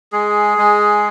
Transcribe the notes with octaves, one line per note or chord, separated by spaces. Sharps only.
G#3 G#4
G#3